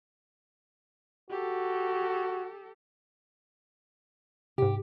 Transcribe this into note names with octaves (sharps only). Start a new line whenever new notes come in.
F#4 G4 A4
G#2 C3 G4